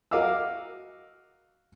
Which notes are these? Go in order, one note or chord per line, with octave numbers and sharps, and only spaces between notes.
F#4 A#4 D#5 F5 D6 E6